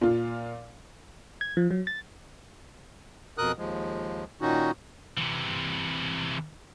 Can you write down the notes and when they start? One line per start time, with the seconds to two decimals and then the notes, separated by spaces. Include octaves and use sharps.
0.01 A#2 F4
1.41 G#6
1.57 F3
1.71 F#3
1.87 A6
3.38 F2 B2 A#4 D#6 F#6
3.58 D#2 F3 G#3
4.41 A#2 D#3 C#4 D#4 F#4
5.18 C3 E3